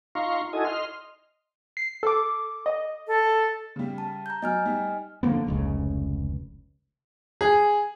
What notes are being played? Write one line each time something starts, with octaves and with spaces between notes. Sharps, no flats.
D#4 F4 F5 A#5 C6 C#6
D#4 E4 F#4 A4 D#5 G#5
D#5 C6 F6
C7
A4 D6
D#5
A4
C#3 G3
A5
A#5 G6
F#3 D#5 G#5 F6
G3 D#4
D3 F3 A#3 B3
F1 C#2 C#3
G#4